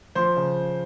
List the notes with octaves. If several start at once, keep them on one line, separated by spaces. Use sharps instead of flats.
F3 C5 C6
C#3